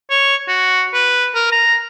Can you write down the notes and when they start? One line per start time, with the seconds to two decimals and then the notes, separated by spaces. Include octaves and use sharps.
0.10 C#5
0.48 F#4
0.94 B4
1.35 A#4
1.52 A#5